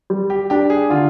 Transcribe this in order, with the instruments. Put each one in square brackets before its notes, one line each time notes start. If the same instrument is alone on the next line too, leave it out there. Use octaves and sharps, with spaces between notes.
[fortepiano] G3
[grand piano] G4
[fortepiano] D4 [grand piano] G4
[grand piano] G#4
[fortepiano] D3 [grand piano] F4